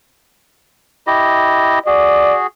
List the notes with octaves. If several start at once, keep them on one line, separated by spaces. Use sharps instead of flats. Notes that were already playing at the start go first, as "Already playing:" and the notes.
E4 G4 D#5
F#4 G#4 D5